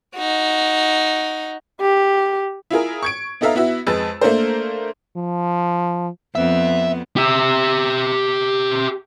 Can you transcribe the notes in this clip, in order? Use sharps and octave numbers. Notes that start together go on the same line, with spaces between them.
D#4 F#4
G4
E4 F4 G#4 A#4
C#6 G#6 D7
B3 D#4 A4 E5 F5 A#5
B3 E4 F#4 E5
F2 G#3 B4 E6 A6
A3 A#3 D4 A#4 C5
F3
F2 B3 C4 E5
G4 E5